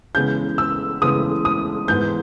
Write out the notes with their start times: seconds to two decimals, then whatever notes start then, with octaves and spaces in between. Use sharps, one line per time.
0.15 C#3 E3 G#3 B3 G6
0.58 E6
1.02 C#3 E3 G#3 B3 D#6
1.45 D#6
1.88 G#2 E3 G#3 B3 G6